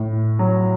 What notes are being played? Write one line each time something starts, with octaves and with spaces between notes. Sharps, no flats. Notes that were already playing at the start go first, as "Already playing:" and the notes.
Already playing: A2
F#3